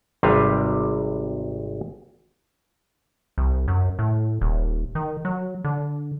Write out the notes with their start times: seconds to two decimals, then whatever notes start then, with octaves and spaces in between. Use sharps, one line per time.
0.23 G#1 C3 G3 B4 F5
3.38 C2
3.68 F#2
3.99 A2
4.41 D#1
4.95 D#3
5.25 F#3
5.64 D3